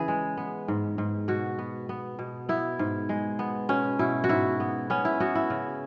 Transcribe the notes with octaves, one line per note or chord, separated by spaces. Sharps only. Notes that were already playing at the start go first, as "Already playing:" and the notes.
Already playing: C#3 E3 G#4 B4
G#3
B3
G#2
G#2
B2 F#4
B3
B3
B2
B3 E4
G#2
G#3
B3
B2 C#4
B2 E4
F#4
G#2 E4
B3
B3 C#4
E4
B3 F#4
E4
C#3